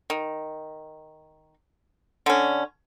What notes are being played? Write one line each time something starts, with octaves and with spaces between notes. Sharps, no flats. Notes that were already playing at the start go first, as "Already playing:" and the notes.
D#3
D3 C#4